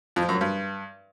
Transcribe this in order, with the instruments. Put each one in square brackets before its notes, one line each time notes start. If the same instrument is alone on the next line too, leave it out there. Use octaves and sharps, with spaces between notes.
[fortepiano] F2
F3
F#2
F#3
G2